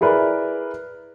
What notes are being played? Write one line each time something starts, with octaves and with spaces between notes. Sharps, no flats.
E4 G#4 A#4 B4 D5